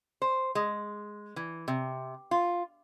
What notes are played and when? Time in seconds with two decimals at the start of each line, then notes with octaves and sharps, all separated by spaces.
0.22 C5
0.55 G#3
1.36 E3
1.68 C3
2.31 F4